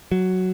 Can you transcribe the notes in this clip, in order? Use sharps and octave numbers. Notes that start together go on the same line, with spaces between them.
F#3